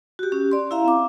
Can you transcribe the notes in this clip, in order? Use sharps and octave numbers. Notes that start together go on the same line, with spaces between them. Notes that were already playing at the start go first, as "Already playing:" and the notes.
F#4 G4
C#4 G4
D5 C6
E4 E5 F5 A#5
C4 D6